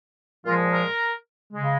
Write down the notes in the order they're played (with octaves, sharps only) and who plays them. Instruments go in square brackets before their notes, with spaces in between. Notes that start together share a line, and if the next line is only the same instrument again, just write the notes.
[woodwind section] A#2 F3 G#3 F4
A#4
C#3 G#3